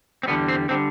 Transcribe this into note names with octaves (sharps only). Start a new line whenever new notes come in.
C4
E2 D3 G3 B3
C4
D3 G3 C4